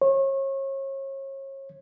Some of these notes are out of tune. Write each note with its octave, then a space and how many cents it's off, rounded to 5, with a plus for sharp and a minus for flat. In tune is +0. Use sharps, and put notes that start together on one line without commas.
C#5 -35